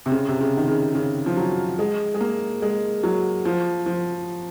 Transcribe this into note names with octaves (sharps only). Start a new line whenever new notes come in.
C3
C#3
C3
C#3
D#3
C#3
C#3
F3
F#3
G#3
G#3
A#3
G#3
F#3
F3
F3